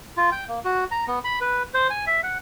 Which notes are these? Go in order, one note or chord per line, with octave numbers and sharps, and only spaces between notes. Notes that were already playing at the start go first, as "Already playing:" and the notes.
F4
G5
A#3
F#4
A#5
B3
B5
B4
C5
G#5
E5
F#5